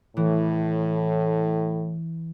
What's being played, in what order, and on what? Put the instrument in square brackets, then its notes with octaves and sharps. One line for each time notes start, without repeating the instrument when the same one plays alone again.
[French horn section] A2 [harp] E3